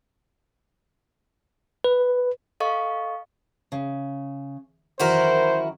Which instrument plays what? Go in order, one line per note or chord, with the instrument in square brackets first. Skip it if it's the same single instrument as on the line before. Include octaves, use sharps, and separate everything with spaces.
[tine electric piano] B4
[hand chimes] A4 D#5 F5 C#6
[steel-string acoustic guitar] C#3
[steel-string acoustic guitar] F#2 D#3 E3 [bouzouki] E4 F#4 A#4 [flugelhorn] C5